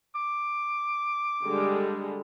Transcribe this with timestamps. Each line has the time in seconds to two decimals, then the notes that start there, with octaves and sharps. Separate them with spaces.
0.15 D6
1.43 D3 G3 G#3